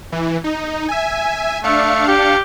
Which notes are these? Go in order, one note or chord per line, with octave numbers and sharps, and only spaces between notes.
E3
D#4
E5 G#5
A3 D4 F5 C#7
G4